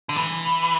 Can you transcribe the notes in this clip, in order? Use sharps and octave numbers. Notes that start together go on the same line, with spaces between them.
D3
E3